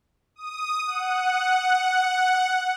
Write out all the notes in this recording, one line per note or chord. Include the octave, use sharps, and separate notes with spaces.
D#6
F#5